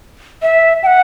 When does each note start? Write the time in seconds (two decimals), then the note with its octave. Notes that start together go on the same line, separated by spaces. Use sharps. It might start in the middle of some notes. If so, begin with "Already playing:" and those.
0.42 E5
0.83 G5
0.86 F#5